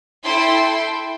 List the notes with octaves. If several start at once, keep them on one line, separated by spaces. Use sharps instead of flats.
E4 A4 G5 C6